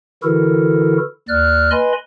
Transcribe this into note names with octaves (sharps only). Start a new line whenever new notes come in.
D3 E3 E4 F#4 A4 A#4
D#2 D5 F6 F#6
B4 D#5 G#5 B5 C6